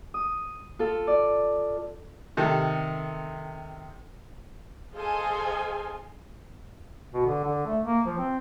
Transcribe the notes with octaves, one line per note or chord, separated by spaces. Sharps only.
D#6
F4 A4 F5
D5
C3 D#3 A4
G#4 A4 C5 D#5 F5 G#5
B2
D3
D3
A3
A#3
F3
C4